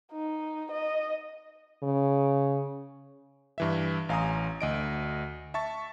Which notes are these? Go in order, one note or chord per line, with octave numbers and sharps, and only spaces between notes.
D#4
D#5
C#3
G2 E3 E5
A1 F5 G#5 A#5 D#6
D2 D#5 D7
E5 A5 C#6 A6